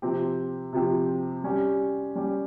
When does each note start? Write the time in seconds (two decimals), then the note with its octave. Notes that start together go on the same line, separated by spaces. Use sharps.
0.02 C3 F3 C4 G4
0.73 C3 F3 C4 G4
1.44 G3 C#4 G4
2.15 G3 C#4 G4